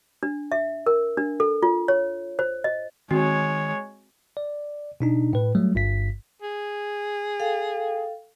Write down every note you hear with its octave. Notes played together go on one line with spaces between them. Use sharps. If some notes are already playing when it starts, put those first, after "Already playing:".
D4
E5
A#4
D4
A4
F4
C#5
C5
D#5
D#3 G#3 C4 F#4 C#5
D5
B2 D4 D#4
A2 B4
F#3 G3 A3
G1 G2 B6
G#4
A4 F5 G5